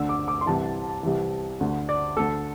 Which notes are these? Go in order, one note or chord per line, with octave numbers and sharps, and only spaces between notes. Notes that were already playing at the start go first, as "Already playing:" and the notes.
Already playing: D2 D3 E6
D6
D6
C6
C2 C3 E3 A5
C2 C3 E3
D2 D3
D5
D2 D3 A4